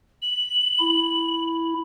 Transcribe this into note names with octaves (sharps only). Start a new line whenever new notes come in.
F#7
E4